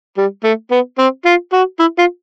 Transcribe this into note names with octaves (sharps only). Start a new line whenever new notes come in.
G3
A3
B3
C4
F4
F#4
E4
F4